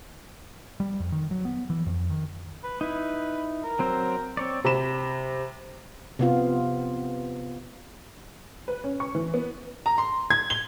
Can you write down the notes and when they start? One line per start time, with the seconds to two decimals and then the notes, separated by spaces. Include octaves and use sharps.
0.80 G3
1.00 F2
1.12 D#3
1.31 F#3
1.45 B3
1.70 E3
1.86 F2
2.10 D#3
2.63 B4
2.81 D#4 E4 B4
3.64 A#4
3.79 F#3 C4 C5
4.37 C4 C#5 D5
4.64 C3 B5 E7
6.19 C3 B3 F4
8.68 B4
8.84 C#4
9.00 C#6
9.15 E3
9.34 B3
9.86 A#5
9.98 C6
10.30 G#6
10.50 G7